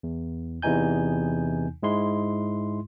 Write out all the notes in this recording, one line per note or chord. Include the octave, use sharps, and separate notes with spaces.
E2
E2 C3 E3 D#4 G#5 G6
G#2 G#3 E4 C6